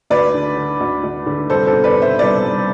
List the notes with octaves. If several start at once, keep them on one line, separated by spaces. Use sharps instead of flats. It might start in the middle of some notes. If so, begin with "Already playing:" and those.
D2 B4 D5
D3
D3
D2
D2
D3
C2 A4 C5
A4 C5
B2
B4 D5
B2
C5 E5
C2 B4 D5
C2